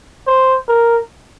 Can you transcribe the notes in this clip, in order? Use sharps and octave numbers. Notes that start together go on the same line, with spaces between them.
C5
A#4